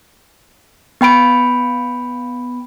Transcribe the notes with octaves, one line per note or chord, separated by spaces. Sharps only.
B3 G5 B5 D7